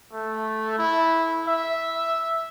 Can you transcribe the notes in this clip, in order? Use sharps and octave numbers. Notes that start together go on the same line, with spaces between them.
A3
E4
E5